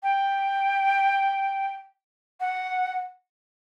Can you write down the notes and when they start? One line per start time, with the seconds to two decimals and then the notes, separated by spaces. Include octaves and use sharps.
0.03 G5
2.40 F#5